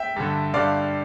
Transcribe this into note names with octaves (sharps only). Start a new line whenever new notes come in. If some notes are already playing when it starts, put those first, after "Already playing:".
Already playing: E5 G5
G2 D3
G2 D3 D5 F5